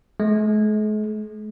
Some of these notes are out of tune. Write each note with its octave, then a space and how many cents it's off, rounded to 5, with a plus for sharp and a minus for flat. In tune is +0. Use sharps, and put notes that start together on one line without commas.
G#3 +45